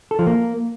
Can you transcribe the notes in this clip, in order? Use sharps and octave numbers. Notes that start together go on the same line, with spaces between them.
A4
F3
A#3